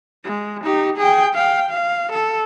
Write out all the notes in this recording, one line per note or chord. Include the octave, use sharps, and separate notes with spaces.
G#3
D#4 G4
G#4 G5
F5 G5
F5
A4